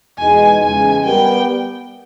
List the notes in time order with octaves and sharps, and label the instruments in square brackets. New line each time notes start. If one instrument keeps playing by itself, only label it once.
[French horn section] E2 B2 G#3 D#4 [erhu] G#5
[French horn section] E2 C#3 G#3 [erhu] G#5
[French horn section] G3 B3 G4 A#4 [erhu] G5